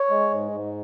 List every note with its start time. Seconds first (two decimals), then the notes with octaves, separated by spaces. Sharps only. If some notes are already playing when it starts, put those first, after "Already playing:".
Already playing: C#5
0.10 G#3
0.31 G#2
0.52 G#2